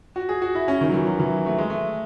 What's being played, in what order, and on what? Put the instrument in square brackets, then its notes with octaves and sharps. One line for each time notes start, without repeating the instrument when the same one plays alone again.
[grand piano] F#4
G#4
F#4
E4
C#4
D#3
F#3
E3
F#3
E3
A3
G#3
A3